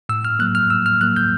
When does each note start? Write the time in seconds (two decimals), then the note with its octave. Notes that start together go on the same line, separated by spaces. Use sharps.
0.09 A2 E6
0.25 F6
0.39 F#3 A#3 F#6
0.55 F6
0.70 A2 E6
0.86 F6
1.01 F#3 A#3 F#6
1.16 G6